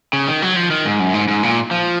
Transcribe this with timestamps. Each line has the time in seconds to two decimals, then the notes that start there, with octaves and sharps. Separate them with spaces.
0.13 C#3
0.28 D#3
0.42 F#3
0.56 F3
0.71 D#3
0.85 G#2
1.00 F#2
1.14 G#2
1.28 G#2
1.43 A#2
1.71 F3